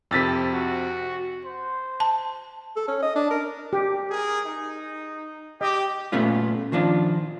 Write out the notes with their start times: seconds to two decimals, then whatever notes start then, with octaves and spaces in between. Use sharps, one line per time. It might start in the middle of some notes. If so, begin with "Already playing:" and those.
0.11 F2 C3 E6 A6 B6
0.54 F#4
1.45 C5
2.00 A5
2.76 A4
2.88 C#4
3.02 D#5
3.16 D4
3.31 A#4
3.73 G4
4.09 G#4 A#4
4.45 D#4
5.61 G4 D#5
6.12 A#2 A3 B3 C#4 F4
6.72 D#3 F3 D4 F4